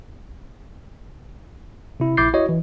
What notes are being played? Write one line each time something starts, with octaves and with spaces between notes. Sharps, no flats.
C3 E4
A#1 E4 D6 G6 A6 C7
E4 F#4 C#5 D#5
E3